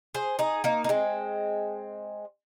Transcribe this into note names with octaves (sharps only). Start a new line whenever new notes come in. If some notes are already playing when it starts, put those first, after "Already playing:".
G#4 C5
D#4 G#4
A#3 D#4
D#4
G#3 C4